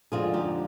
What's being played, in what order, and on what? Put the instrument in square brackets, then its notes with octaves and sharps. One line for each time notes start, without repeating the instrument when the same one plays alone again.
[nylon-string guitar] F2 D3 F3 G#3 D4 F4 G#4
D#4 G4